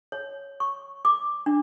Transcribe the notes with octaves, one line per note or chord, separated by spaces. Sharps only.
C#5
C#6
D6
D4